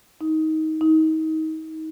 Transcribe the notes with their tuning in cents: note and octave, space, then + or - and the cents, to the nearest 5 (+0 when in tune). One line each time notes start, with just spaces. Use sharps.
D#4 +20
D#4 +30